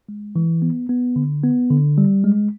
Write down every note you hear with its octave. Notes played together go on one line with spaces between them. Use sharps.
G#3
E3
B3
B3
D3
B3
D3
G3
G#3